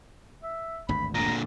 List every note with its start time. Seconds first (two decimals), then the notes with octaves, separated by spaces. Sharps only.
0.43 E5
0.89 G#1 D2 G2 B5
1.15 A#2 D3 A#5